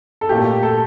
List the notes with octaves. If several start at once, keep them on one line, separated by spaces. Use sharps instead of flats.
A4
A#2 A3 G4
A4